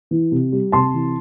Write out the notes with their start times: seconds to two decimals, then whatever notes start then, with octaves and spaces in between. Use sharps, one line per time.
0.11 E3
0.32 C3
0.52 G3
0.72 C3 A5 C6
0.94 E3